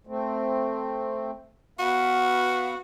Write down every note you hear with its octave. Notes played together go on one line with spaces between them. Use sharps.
A3 C4
B3 F#4 B4 F5